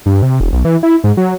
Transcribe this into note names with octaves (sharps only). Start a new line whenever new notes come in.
G2
C3
E1
B1
E3
E4
G#2
F#3